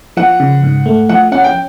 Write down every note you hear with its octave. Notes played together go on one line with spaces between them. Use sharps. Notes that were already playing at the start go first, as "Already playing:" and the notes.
F3 F#5
C#3
G#2
A3
F3 F#5
C#4 F#5
G5